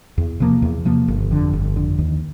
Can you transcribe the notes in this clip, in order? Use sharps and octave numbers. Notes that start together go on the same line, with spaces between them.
E2
C3 F3 A#3
E2
C3 F3 A#3
G1
F2 D3
G1
F2 D3
D#2